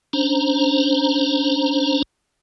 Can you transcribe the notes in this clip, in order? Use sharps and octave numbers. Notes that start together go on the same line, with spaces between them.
C#4 D4 C5 A#5